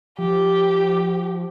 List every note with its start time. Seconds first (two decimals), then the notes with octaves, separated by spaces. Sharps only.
0.18 F3 G4